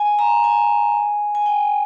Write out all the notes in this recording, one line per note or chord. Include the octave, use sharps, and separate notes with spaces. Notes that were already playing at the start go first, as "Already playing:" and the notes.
Already playing: G#5
A#5
G#5
G#5
G5